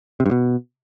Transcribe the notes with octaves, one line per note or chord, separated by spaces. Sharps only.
C3
G2
B2